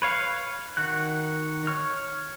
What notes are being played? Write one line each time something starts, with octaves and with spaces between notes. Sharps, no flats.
B4 C#5 F5
D#3 F#4 F#6
C#5 C#6 F6